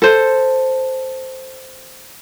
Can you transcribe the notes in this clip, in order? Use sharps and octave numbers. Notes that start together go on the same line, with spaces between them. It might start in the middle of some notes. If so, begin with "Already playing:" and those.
A4 C5